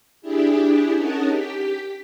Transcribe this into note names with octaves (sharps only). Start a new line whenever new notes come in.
D4 E4 G4 G#4
C#4 D#4 G#4 A#4 F#5 A5
G4 B6